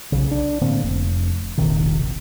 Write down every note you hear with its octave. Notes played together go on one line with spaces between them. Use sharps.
B1 C#3
D4
A2 D3 A#3 C4
F1
E1 A#1 C3 D#3